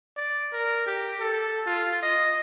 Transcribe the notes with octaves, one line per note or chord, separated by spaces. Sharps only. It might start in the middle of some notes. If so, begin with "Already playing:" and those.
D5
A#4
G4
A4
F4
D#5